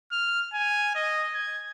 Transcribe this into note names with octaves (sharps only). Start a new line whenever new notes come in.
F6
G#5
D#5
G#6